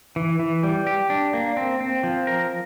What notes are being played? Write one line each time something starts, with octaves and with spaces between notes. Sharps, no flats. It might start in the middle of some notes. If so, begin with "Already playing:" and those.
E3
E3
G3
G4
D4
A#3
C4
C4
F3
A#4